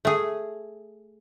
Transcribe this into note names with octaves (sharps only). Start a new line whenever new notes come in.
A3 G#4